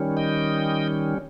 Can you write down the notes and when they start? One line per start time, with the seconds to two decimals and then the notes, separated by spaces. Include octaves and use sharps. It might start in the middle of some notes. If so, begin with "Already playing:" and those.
Already playing: D#3 G3 C#4
0.17 D#5 G5